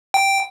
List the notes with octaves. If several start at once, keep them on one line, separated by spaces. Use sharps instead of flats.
G5